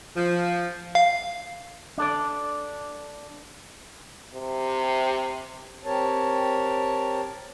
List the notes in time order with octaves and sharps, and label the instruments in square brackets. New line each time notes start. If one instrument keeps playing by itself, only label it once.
[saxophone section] F3
[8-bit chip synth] F5
[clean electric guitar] D4 A4 D5
[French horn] C3
[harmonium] C4 G4 A#4 C#5 A5